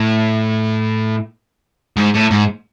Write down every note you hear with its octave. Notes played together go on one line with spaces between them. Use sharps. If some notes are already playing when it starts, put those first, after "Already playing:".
Already playing: A2
G#2
A2
G#2